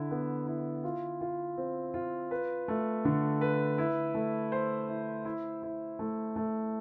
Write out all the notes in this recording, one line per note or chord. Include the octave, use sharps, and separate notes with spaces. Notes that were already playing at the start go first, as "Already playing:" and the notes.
Already playing: D3 E4
B3
E4
F4
F4
C4
F4
B4
A3
D3
B4
E4
A3
C5
E4
E4
E4
A3
A3